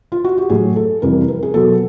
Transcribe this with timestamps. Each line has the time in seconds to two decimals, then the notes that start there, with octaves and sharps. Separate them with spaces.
0.12 F4
0.24 F#4
0.38 G4
0.50 A2 F#3 A3 G#4
0.76 A4
1.02 F2 C3 E3 G3 A#4
1.28 A#4
1.43 G#4
1.54 B2 F#3 B3 A4